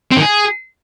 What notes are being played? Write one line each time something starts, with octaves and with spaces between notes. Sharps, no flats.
C4
D#3
G#4